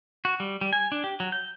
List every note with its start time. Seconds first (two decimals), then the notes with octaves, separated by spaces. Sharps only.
0.25 F#4
0.40 G3
0.61 G3
0.73 G#5
0.92 D4
1.04 G4
1.20 F#3
1.32 G6